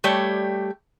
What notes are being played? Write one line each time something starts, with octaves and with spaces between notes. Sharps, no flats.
G3 A3 G4 C#5